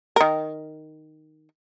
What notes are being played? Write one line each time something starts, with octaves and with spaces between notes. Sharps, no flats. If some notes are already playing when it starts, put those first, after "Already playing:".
D#3 A#4